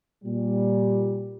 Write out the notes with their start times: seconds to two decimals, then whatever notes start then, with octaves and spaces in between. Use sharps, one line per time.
0.24 A#2 G3